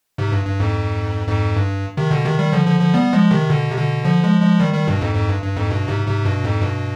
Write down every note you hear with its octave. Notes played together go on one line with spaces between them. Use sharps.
G#2 C3
G2
G2
F2 G#2
F2 G#2
G2
C3 D#3
B2 D3
C3 D#3
D#3 G3
D3 F3
D3 F3
D3 F3
G3 B3
F3 G#3
C3 D#3
B2 D3
C3
B2 D3
D3 F3
F3 G#3
F3 G#3
D#3 G3
D#3 G3
G2 B2
F2 G#2
F2 G#2
G2
G2
F2 G#2
G2 B2
G#2 C3
G#2 C3
G2 B2
F2 G#2
G2 B2